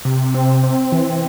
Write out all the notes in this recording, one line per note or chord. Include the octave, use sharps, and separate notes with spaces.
C3
C4
C4
E3